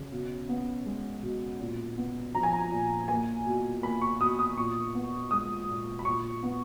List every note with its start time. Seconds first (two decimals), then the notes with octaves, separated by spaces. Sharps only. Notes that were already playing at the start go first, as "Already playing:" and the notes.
Already playing: C#3
0.12 B2
0.49 B3
0.85 G#3
1.23 B2
1.60 A#2
1.97 B3
2.35 F3 A#5
2.43 G#5
2.53 A#5
2.71 A#2
3.08 A#3 G#5
3.46 B2
3.82 A#3 B5
4.01 C#6
4.20 B2 D#6
4.39 D#6
4.57 A#2 C#6
4.95 B3
5.31 G#3 D#6
5.68 A#2
5.99 B5
6.05 A#2 C#6
6.43 B3